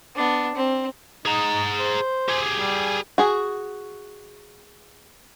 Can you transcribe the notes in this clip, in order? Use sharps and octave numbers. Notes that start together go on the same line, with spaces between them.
B3 D4
C4
D#4 G#4 A#5
C5
G4 G#4
G3
F#4 G#4